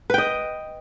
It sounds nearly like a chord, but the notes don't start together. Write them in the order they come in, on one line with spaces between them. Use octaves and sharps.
B4 G5 D#5